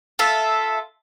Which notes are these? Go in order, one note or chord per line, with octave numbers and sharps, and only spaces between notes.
F4 A4 E5